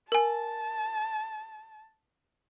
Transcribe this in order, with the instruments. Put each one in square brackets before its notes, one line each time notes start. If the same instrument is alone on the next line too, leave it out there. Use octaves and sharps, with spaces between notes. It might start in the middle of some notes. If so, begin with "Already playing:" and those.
[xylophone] A#4 G#5 [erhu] A5